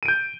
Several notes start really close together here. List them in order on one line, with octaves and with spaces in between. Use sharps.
D#7 D7 G6